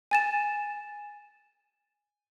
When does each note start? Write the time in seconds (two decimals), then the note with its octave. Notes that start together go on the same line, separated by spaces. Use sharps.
0.11 G#5 A6 E7